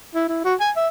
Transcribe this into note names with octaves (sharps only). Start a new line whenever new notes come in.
E4
E4
F#4
G#5
E5